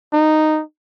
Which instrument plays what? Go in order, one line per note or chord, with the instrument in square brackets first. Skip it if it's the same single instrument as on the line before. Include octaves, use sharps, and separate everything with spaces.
[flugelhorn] D#4